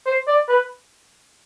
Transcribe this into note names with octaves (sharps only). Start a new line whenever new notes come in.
C5
D5
B4